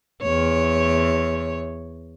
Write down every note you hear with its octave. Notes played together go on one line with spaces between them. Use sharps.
E2 C#5